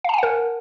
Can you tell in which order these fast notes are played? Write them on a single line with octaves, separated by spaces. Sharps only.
F5 A5 G#5 F#5 A#4